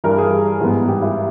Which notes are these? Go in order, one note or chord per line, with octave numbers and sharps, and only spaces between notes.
G2 E3 G3 A#4
G#4
G#2 E3 G3 B3
G4
E4